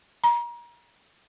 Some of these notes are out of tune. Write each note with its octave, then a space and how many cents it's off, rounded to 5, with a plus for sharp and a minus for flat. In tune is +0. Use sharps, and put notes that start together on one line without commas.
A#5 +35